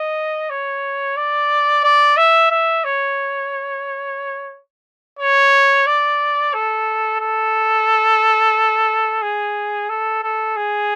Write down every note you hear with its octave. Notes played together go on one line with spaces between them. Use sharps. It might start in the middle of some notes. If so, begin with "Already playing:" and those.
Already playing: D#5
C#5
D5
D5
E5
E5
C#5
C#5
D5
A4
A4
G#4
A4
A4
G#4